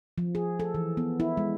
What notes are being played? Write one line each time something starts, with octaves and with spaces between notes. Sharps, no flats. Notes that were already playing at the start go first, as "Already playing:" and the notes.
F3
G#4
A4
E3
B3
E4
G#3